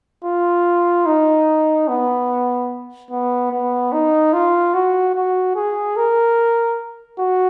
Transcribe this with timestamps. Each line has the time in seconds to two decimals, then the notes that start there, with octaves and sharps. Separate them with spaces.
0.25 F4
1.06 D#4
1.88 B3
3.11 B3
3.52 B3
3.93 D#4
4.33 F4
4.74 F#4
5.15 F#4
5.55 G#4
5.96 A#4
7.18 F#4